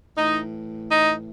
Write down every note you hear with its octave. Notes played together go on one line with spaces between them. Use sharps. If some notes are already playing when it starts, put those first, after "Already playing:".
A2 E3 D#4
D#4